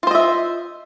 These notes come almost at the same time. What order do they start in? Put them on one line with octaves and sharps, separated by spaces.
F4 C5 D#5 E5